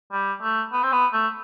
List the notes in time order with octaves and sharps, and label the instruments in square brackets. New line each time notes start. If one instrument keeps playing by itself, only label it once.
[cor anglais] G3
A3
B3
C4
B3
A3